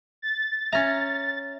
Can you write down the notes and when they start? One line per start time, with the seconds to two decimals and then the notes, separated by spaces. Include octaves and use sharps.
0.22 A6
0.72 C#4 E5 A#5